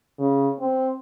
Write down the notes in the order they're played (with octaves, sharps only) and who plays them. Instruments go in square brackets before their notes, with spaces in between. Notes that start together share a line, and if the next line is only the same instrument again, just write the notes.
[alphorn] C#3
C4